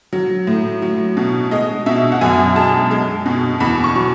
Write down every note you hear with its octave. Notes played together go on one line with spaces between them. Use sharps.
F#3
A2
F#3
B2
G#3 D#5
B2 E5
F#5
F#2 G#5
G#3 A5
G#3
B2
E2 B5
C#6
F#3